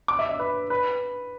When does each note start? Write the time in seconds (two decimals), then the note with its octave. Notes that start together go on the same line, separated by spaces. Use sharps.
0.08 D6
0.19 E5
0.29 E5
0.39 B4
0.70 B4